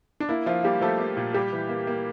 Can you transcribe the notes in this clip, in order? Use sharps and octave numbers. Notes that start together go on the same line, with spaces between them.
D4
A#3 E4
F3 F4
G3 A#3 G4
F3 A3 A4
A#3
A#2
G3 G4
E3
A#3
A#3